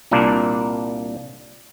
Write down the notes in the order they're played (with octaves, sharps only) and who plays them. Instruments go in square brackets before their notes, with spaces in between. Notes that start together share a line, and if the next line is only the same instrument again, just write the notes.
[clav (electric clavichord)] C2 A#2 A#3 D4